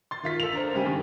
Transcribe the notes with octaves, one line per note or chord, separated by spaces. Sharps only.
C6 A6
D#3 F4 B6
A4 F7
D4 A#4 C5
C#3 G3 G#3 C4 G4 D#7
G2 D#3